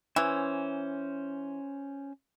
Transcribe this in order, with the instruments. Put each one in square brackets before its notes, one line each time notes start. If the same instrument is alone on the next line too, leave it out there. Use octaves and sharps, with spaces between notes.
[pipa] E3 [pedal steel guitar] C#4 C5